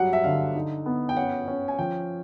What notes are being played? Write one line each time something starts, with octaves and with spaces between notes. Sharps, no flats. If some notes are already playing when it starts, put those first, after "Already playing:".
Already playing: F#3 G3 F#5
E5
D3 F5
D#4
B3
G5
C#4 F#5
C#4
G#5
F3 G5